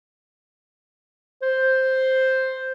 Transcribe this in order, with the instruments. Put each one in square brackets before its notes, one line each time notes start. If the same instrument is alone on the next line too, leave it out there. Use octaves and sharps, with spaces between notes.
[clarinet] C5